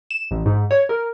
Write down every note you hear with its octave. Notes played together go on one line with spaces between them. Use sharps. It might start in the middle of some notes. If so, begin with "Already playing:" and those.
E7
A1
G#2
C#5
A#4